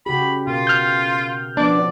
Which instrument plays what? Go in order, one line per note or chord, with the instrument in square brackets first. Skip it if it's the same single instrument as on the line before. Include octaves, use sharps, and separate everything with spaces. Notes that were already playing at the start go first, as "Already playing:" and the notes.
[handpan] C#3 F#4 G4 [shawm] B5
[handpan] B2 A#4 [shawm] F4
[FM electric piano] F6 G6
[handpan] F3 B3 [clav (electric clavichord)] D4 [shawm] D5